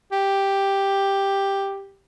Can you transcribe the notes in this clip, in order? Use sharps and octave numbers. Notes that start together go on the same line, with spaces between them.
G4